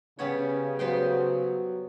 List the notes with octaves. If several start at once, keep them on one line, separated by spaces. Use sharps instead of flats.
C#3 G3 B3 C#4 C#5
F#3 B3 C5 G5